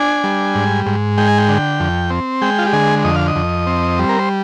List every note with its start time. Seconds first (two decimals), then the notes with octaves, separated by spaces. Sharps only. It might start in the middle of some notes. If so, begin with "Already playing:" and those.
Already playing: D4 G#5
0.24 G3
0.55 G#2
0.86 G#2
1.18 G#3 G5
1.28 G#5
1.38 G5
1.49 D3
1.80 F2
2.10 C4
2.42 G#3 G5
2.59 F4
2.66 G4
2.73 D3 G#4
3.04 F2 D#5
3.16 F5
3.27 D#5
3.36 F2
3.67 C4
3.99 G3
4.09 A#4
4.19 C5